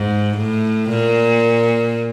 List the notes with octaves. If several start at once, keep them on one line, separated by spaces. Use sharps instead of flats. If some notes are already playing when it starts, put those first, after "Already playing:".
Already playing: G#2
A2
A#2